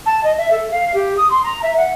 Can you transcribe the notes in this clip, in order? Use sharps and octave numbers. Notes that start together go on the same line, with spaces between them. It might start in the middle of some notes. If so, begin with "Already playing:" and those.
A5
D#5
E5
A4
F5
G4
D#6
C6
A#5
E5
F#5